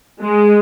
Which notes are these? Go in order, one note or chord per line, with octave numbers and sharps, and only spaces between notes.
G#3